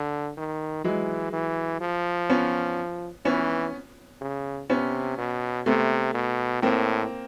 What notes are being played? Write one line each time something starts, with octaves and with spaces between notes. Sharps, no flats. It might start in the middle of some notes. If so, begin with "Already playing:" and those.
Already playing: D3
D#3
E3 F#3 G#3
E3
F3
B3 C#4
E3 B3 C#4
C#3
C3 B3 C#4
B2
C3 A3 B3
B2
A2 A#3 C4